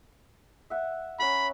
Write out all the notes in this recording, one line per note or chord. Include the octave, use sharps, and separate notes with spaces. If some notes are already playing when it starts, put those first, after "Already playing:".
E5 F#5
C#4 A#4 F#5 B5